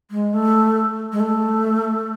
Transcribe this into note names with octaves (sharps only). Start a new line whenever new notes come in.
G#3
A3
G#3
A3